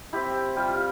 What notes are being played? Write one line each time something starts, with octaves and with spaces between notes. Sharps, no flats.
C4 E4 G4
G3 F4
F4